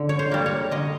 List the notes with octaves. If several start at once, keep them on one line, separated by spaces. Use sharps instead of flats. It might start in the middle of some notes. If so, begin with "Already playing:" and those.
Already playing: D3
C#5
C5
G3 A#3
C#5
D3 D#5